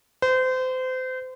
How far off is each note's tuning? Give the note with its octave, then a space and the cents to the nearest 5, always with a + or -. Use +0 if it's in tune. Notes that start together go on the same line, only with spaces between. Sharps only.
C5 -30